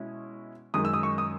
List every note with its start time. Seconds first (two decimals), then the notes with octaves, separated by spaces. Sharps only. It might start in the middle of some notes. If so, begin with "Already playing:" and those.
Already playing: B2 G#3 C#4 E4
0.74 F#2 D#3 G#3 D#6
0.85 E6
0.93 D#6
1.03 C#6
1.18 D#6